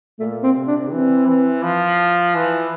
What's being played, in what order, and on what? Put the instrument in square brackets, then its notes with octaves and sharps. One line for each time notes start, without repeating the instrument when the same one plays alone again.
[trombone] A#2 [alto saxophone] A3
[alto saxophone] C4
[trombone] C3
[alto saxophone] D4
[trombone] E3 [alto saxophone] C4
[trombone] E3
F3
E3